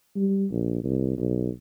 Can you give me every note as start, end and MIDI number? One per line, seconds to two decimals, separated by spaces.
0.16 0.46 55
0.51 0.81 34
0.84 1.17 36
1.18 1.49 35